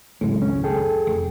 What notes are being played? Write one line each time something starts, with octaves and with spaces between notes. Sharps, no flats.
G#1 C#2 F#2 A2 G#3
C#4
G#4 A4 G5
F1